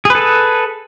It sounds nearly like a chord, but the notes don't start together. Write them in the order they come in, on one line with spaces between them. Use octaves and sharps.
G#4 B4 A4